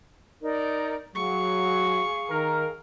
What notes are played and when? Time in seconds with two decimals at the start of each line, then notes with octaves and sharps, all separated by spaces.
0.42 D#4 A#4 D5
1.15 F#3 G#4 F5 C#6
2.30 D#3 A#4